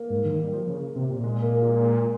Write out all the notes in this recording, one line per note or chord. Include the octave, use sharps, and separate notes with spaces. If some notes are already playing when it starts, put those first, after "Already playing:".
Already playing: A#3
G#2
D#3
G3
F3
C#3
C3
A#2
G#3
A#3
G#3
G#3